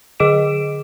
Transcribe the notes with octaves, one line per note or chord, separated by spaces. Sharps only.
D3 G#4 D#5 D6 D7 E7